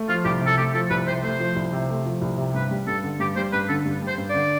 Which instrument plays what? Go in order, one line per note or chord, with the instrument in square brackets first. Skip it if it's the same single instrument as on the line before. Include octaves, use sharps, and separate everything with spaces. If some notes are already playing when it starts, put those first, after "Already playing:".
Already playing: [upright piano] A3
[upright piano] F3 [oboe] F4
[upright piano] C2 [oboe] G4
[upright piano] C3 [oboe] A4
[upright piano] A3 [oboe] G4
[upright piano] F3 [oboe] A4
[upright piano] C2 [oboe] B4
[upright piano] C3 [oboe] C5
[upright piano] A3 [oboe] C5
[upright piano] F3
C2
C3
A3
F3
C2
C3
[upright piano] G2 [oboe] B4
[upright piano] G3
[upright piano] G2 [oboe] A4
[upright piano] D3
[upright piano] G2 [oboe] G4
[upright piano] G3 [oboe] C5
[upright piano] G2 [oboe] B4
[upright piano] D3 [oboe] A4
[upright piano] G2
G3
[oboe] C5
[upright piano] G2
[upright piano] D3 [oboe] D5